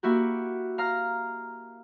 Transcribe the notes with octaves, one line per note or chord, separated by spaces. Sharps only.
A#3 E4 F#4 G4
F5 A#5 F6